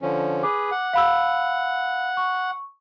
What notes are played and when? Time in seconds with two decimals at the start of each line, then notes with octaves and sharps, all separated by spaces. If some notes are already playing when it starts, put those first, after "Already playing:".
0.02 D3 F3 C#4
0.43 G#4 B4 D6
0.72 F#5
0.93 F5 B5 E6
2.17 C#6